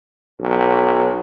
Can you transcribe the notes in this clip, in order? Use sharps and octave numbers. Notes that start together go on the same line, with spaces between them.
B1